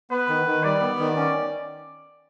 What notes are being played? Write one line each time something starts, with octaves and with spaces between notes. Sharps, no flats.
B3 B4
D#3
D#3
G3 D5
B3
D#3
C#4